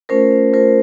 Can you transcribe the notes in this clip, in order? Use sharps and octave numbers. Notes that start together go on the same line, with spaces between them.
A3 C#4 F4 A#4 C5
A3 C#4 F4 A#4 C5